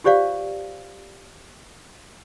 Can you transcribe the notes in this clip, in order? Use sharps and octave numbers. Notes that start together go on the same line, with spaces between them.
F4 G4 C5 D5 F5